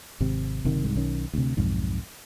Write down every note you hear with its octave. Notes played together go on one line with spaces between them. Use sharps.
G#1 C3
F#1 C3 D#3
C2 G#2
B1 D#3 C#4
D2 C3
B1 F2 G#2